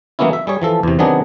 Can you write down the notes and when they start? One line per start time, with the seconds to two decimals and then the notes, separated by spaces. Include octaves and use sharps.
0.19 E3 F#3 A#3 B3 C#4 E4
0.33 E5
0.47 G3 G#4 C#5
0.62 E3 F3 A4
0.83 E2 C3
0.99 C3 D#3 F#3 B3 D4 G#4